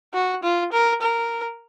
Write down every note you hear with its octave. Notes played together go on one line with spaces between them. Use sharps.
F#4
F4
A#4
A#4